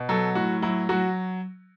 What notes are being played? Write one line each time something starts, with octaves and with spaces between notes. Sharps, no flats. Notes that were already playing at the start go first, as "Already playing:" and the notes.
Already playing: B2
F#3 A4
A2 F#4
F#3 E4
F#3 F#4